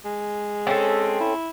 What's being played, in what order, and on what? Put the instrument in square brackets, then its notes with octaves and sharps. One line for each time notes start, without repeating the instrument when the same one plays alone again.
[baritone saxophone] G#3
[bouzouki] C4 C#4 A4
[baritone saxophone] E4